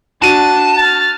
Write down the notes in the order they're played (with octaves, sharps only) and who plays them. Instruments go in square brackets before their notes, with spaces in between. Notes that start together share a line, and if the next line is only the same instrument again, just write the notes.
[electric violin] D4 [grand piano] F#4 D#7 [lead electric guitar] A5
[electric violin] F6 A6